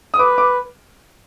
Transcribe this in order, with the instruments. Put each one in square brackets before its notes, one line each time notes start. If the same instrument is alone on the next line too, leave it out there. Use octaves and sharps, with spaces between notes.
[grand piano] D#6
[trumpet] B4 [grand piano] D6
[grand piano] D6